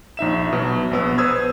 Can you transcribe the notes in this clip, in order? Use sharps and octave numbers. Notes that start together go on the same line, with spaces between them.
A#1 D#4 E5 E7
B2 F#3
A#1 B3 E6
B4 C5 D#6 E6 G#6